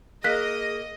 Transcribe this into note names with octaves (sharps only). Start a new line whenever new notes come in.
A#3 G#4 D#5 F#6 B6